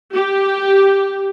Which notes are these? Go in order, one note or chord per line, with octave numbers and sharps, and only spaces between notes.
G4